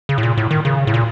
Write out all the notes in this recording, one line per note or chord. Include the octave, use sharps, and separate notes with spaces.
C#3
A2
A#2
A2
D#3
C#3
A2
A#2